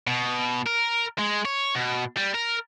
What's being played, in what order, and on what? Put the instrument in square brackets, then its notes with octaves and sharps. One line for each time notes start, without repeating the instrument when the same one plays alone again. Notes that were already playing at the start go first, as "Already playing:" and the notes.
[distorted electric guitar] B2
A#4
G#3
C#5
B2
G3
A#4